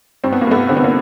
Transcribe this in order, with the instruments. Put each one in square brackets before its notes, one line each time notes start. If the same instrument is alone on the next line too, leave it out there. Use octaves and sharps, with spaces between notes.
[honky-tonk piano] G2 C4
B3
A#3
G2 A3 B3
D3 C4
B3
A#3 C4